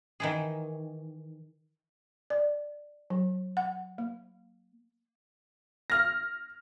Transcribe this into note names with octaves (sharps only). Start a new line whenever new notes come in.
D#3 E3 G#4
D5
F#3
F#5
A#3
F6 A#6